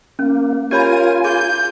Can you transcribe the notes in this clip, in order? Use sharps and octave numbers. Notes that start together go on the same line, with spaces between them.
A#3 C#4
F4 G4 A#4 C#5 G#5 B5
G#4 G6